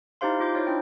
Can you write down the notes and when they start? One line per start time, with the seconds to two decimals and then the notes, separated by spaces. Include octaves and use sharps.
0.21 D#4 E4 G4 C5 F5 C6
0.40 F4 D6 G6
0.55 D#4 E4 C5 C#5
0.67 D4 E4 G5